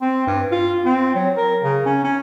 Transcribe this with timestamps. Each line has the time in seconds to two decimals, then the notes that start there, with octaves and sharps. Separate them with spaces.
0.02 C4
0.27 G2
0.52 F4
0.85 C4
1.15 F#3
1.37 A#4
1.64 C#3
1.86 C#4
2.04 C#4